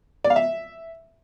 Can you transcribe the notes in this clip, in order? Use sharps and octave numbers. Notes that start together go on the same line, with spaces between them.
D5
F5
E5